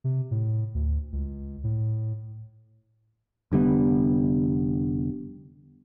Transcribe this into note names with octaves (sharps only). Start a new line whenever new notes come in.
C3
A2
D2
C#2
A2
F1 D3 G3 B3